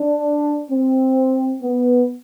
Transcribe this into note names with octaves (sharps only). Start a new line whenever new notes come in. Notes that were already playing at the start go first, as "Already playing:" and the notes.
Already playing: D4
C4
B3